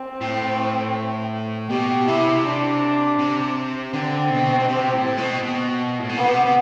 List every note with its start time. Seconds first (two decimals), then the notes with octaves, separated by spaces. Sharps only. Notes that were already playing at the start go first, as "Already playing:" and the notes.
Already playing: C4
0.21 A2
1.69 B2 G4
2.07 C3 E4
2.45 D4
3.19 C3
3.93 D3 C4
4.30 B2
4.60 B2
4.68 C3
4.94 A2
5.18 B2
5.44 B2
5.99 A2
6.09 B2
6.18 C3 B3
6.46 C3